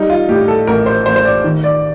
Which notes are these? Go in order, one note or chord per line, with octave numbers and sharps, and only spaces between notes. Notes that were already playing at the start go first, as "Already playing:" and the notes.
Already playing: G3 D#4
F4
A2 G4
A4
A1 A#4
C5
A1 C5
C5
D5
D#3
D5